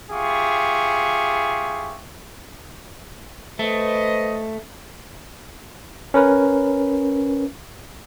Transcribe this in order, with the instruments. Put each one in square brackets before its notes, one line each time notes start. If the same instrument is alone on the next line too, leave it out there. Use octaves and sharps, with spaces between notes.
[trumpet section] F4 G4 G#4 E5 C#6
[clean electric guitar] A3 [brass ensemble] B4 C5 D#5
[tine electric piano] C#4 A#4 B4